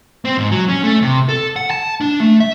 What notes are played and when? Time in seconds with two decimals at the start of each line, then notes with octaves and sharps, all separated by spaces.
0.25 C4
0.38 G#2
0.51 F#3
0.68 C#4
0.83 A3
1.02 C3
1.29 A4
1.56 F#5
1.71 A5
2.01 D4
2.20 A3
2.40 E5